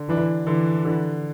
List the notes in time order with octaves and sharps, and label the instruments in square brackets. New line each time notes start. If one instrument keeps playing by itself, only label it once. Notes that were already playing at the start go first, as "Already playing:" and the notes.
Already playing: [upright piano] D3
[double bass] E3 [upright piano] D4
[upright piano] D3 [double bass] E3
[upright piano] D3